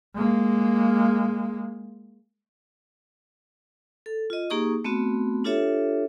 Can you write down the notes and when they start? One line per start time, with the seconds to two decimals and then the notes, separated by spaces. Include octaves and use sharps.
0.15 G#3 A#3
4.06 A4
4.30 F4 D#5
4.50 A#3 D#4 G4 G#4 C#6 D#6
4.84 A3 B3 C4 F#4
5.44 D4 F4 G4 A4 C#5 E5